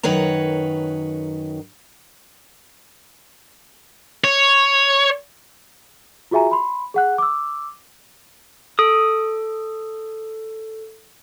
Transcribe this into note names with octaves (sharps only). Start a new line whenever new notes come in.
F#2 D#3 B4 C#5 A#5
C#5
F4 F#4 G#4 E5 G#5 A#5
B5 C6
G#4 F#5 F#6
D6 E6
A4 D#6